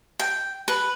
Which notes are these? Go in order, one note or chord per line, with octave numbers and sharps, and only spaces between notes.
G5
B4